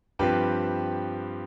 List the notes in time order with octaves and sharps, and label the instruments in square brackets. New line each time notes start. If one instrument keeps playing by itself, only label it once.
[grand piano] G2 F3 C4 G4 B4